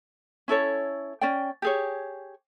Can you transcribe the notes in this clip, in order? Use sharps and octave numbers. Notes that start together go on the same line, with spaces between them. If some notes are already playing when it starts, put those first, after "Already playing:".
C#4 E4 A4 C#5
C#4 D5 G5
G4 G#4 C#5